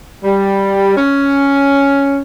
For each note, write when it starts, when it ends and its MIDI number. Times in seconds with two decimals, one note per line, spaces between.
0.24 0.96 55
0.97 2.21 61